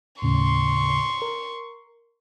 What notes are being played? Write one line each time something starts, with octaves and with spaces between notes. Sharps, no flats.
D#2 A2 C#3 C6 C#6
A#4